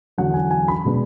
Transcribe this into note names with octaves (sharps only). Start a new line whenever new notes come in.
E2 D3 F#3 F#5
G#5
G#5
B5
B2 G#3 B3 D4